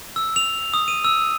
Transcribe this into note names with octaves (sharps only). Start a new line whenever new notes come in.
E6
F7
D#6
D#7
E6